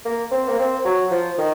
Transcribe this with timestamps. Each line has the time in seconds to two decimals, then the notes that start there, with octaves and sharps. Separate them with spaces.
0.05 A#3
0.31 C4
0.48 A#3
0.59 C4
0.85 F#3
1.11 F3
1.38 D#3